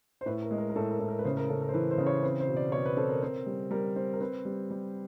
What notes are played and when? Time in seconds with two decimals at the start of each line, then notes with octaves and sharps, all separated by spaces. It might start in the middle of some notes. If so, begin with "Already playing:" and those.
0.21 C5
0.26 A2 B4
0.42 A#4
0.51 G#3
0.58 A#4
0.70 A#4
0.76 A2 A4
0.91 A#4
0.99 A2
1.08 A#4
1.19 B4
1.25 C#3 C5
1.37 A#4
1.49 C#3 A4
1.62 A#4
1.69 C5
1.73 E3 B4
1.91 C5
1.98 C#3
2.06 C#5
2.23 C4 B4
2.40 C5
2.48 B2
2.56 D5
2.72 B2 C#5
2.85 B4
2.97 C4 A4
3.09 A#4
3.22 C4 A#4
3.46 G3
3.71 G3 A#4
3.96 C4
4.13 A#4
4.21 C4 B4
4.45 G3
4.71 G3